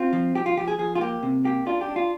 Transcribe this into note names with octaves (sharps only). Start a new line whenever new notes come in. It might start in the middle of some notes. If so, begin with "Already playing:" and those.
Already playing: C4 F4
F3
F3 G4
F4
F3 G4
G#4
F3 G#4
F4
A#3 G4
C3
A#3 G4
D4 F4
G4
D4
F4